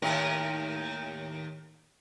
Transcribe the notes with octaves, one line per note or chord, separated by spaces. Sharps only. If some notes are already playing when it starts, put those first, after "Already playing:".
D#2 A2 A#4